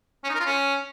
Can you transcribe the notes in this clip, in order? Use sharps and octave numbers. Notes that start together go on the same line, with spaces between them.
C#4
D#4
A#4
F4
C#4